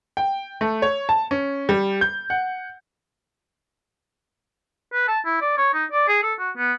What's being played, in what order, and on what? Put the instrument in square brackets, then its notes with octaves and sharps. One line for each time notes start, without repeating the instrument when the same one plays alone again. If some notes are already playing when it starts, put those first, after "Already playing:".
[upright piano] G5
A3
C#5
A5
C#4
G3
G6
F#5
[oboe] B4
A5
E4
D5
C#5
D#4
D5
G#4
A4
F#4
B3